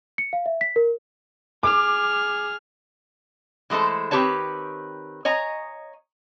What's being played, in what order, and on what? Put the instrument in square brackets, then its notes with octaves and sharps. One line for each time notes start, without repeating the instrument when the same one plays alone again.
[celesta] C#7
F5
E5
B6
A#4
[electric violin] G#4 F6 [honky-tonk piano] D6
[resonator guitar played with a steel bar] E3 G#3 A3 A4 C5
D#3 C4 G4 B4 C#5 A5
C#5 D#5 G#5 A#5